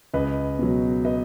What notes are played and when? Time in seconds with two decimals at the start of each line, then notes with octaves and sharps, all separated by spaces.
0.14 C#2 B4 D#5
0.59 B2 F#3
1.05 B4 D#5